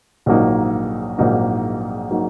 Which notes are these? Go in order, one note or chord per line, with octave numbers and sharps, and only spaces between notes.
A#1 G#2 F#3 A#3 D#4
A#1 G#2 F#3 A#3 D#4
F#3 A#3 D#4